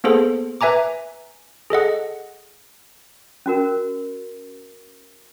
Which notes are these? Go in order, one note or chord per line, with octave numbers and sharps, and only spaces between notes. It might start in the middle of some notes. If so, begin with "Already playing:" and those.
A#3 B3 G#4 A4 C5
B4 E5 G#5 A#5 D6
G#4 A4 D#5 F#5
C#4 F#4 A#4